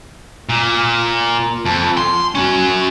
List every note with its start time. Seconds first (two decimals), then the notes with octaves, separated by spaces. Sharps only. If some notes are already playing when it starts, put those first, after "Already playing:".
0.49 A#2
1.65 F2
1.97 C6
2.35 C#4 F#4